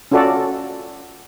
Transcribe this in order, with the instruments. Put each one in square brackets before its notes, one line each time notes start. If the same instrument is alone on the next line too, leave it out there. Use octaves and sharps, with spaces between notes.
[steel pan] C#4 F4 F#4 A4 D5